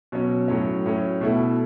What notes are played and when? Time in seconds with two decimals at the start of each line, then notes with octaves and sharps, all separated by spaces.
0.12 B2 F#3 C#4
0.48 A2 F#3 C#4
0.86 A2 F#3 C#4
1.21 B2 A3 E4